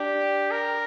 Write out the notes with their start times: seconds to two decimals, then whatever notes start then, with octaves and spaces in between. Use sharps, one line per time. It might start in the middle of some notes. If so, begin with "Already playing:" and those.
Already playing: D4 G4
0.51 A#4